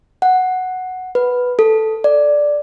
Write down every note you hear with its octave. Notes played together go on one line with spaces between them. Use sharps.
F#5
B4
A4
D5